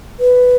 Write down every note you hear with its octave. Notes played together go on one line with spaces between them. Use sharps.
B4